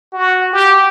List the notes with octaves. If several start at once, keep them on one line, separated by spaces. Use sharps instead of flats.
F#4
G4